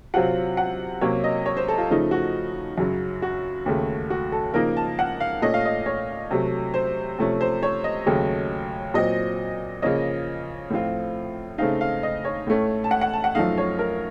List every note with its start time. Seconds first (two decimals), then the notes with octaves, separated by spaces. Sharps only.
0.14 C3 F#3 C4 F4 F#5
0.57 F#5
1.01 C3 F#3 A#3 C#4 C#5
1.24 D#5
1.46 C#5
1.57 C5
1.68 A4
1.78 F4
1.90 C#3 F3 A3 D#4
2.11 F#4
2.78 F#2 C#3 F#3
3.22 F#4
3.66 D#2 C#3 A3
4.10 F#4
4.32 A4
4.54 C#3 F3 A#3 D#4 A#4
4.77 A5
4.99 F#5
5.20 F5
5.42 A#2 A3 C#4 D#5
5.54 F5
5.65 D#5
5.86 C#5
6.31 C3 F#3 A3
6.74 C5
7.19 C3 F3 A3 C#4
7.41 C5
7.63 C#5
7.84 D#5
8.06 D#2 C#3 F#3 A3 C#4
8.94 A#2 F#3 C4 D#5
9.82 C#3 F3 A#3 C#4 D#5
10.70 A2 F3 C4 F4
11.58 C#3 A3 C4 D#4 F5
11.81 F5
12.03 D#5
12.25 C#5
12.47 A2 A3 C#4
12.84 A5
12.91 F#5
13.01 F#5
13.13 A5
13.24 F#5
13.35 F#2 F3 A3 D#4 F5
13.58 C#5
13.79 A#4